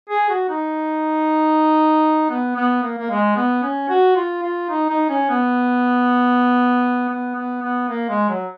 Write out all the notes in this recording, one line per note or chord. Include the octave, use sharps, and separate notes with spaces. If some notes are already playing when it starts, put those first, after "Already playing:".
G#4
F#4
D#4
B3
B3
A#3
A#3
G#3
B3
C#4
F#4
F4
F4
D#4
D#4
C#4
B3
B3
B3
B3
A#3
G#3
F#3